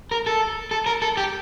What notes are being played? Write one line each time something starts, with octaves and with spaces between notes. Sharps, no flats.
A#4
A4
A4
A#4
A4
G4